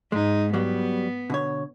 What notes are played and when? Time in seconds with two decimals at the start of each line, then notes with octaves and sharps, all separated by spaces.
0.12 G#2 G#3 D#4
0.54 F#3 G3 B3
1.30 B2 D3 C#5